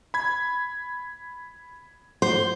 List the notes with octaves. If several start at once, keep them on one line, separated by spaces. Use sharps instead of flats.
B5 G#6
C5